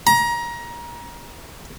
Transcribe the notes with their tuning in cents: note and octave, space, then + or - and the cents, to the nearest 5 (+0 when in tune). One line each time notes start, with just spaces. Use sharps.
A#5 +25